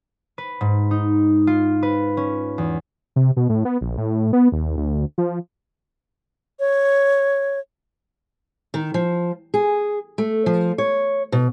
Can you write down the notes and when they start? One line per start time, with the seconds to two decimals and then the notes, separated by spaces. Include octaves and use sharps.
0.38 B4
0.61 G#2
0.91 D#4
1.47 F4
1.83 B4
2.17 C#4
2.58 E2
3.16 C3
3.37 B2
3.49 A2
3.65 B3
3.81 A#1
3.98 A2
4.33 B3
4.52 D#2
4.77 D2
5.18 F3
6.60 C#5
8.74 D#3
8.94 F3
9.54 G#4
10.18 A3
10.46 F3
10.78 C#5
11.32 B2